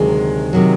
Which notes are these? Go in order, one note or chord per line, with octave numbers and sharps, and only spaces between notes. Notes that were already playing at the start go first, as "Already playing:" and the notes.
Already playing: D2 C3 D#3 F#3 G#3
C3 D#3 F#3